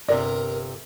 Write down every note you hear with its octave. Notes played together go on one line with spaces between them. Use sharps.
G1 C3 A#4 D5